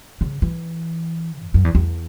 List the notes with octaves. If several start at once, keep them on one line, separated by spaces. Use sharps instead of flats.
C#3
E3
E2
F#2
E2
E2